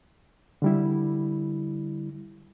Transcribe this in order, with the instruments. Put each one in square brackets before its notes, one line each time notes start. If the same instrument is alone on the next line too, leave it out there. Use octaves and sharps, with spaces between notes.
[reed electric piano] D3 G3 E4